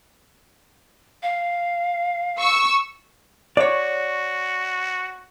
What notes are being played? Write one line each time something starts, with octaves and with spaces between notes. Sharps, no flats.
F5
C#6 E6
F#4 C#5 D5